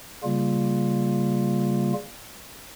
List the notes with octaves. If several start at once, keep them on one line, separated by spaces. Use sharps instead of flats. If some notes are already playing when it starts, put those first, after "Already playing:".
C#3 G3 A#3 F4